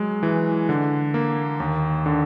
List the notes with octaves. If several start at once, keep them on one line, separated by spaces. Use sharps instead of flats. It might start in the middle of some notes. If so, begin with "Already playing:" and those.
Already playing: F#3 G#3
E3
D3
A#3
D#2
D3